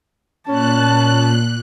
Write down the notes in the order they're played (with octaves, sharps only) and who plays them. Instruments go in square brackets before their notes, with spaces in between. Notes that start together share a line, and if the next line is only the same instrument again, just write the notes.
[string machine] A#2 F#6 [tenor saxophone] C#4 [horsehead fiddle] A5